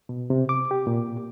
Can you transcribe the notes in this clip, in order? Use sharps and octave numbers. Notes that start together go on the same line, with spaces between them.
B2
C3
D6
G4
A#2